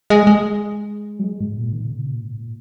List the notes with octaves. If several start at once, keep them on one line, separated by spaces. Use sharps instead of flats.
G#3
G#3
F#3
G#3
G#2
A#2
D#3
A#2
C#3
A#2
G#2
A#2